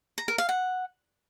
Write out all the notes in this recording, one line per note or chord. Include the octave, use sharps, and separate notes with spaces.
A#5
A#4
F5
F#5